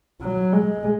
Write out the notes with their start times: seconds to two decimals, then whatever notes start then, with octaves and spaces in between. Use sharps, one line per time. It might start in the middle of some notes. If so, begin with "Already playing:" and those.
0.21 F#3
0.53 G#3